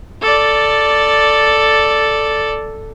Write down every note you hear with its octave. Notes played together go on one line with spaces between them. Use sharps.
A4 D5